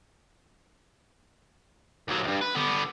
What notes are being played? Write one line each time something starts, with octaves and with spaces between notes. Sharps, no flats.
D#2 F#3
E2 G2
B4
D3 B3